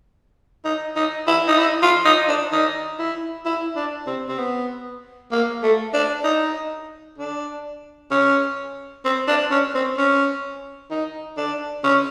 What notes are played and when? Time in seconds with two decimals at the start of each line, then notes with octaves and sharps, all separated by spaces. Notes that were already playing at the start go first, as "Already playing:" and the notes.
0.65 D#4
0.96 D#4
1.27 E4
1.47 D#4
1.59 E4
1.82 F4
2.05 D#4
2.28 D4
2.52 D#4
2.99 E4
3.45 E4
3.76 D4
4.07 C4
4.29 C4
4.38 B3
5.31 A#3
5.63 A3
5.94 D4
6.24 D#4
7.18 D4
8.11 C#4
9.05 C4
9.28 D4
9.51 C#4
9.75 C4
9.97 C#4
10.91 D#4
11.37 D4
11.84 C#4